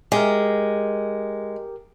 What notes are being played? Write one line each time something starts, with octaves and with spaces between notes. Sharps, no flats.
G#3 G4 A#4